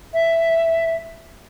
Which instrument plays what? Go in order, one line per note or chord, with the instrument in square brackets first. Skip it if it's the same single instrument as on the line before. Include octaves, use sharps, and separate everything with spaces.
[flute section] E5